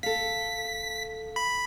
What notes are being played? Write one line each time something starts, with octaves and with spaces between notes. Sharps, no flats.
A4 F5 B6
B5